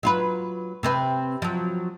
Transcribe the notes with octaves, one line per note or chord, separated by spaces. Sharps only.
F#3 F4 B4
C3 C4 B4
F3 F#3